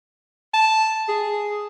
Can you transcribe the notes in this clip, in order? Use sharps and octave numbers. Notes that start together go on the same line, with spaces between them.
A5
G#4